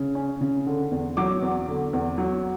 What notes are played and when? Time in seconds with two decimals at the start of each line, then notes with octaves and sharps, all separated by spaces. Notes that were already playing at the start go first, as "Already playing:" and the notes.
Already playing: C#3
0.15 C#4
0.41 C#3
0.66 D3
0.91 E2
1.17 F#3 D6
1.42 E2
1.68 D3
1.93 E2
2.18 F#3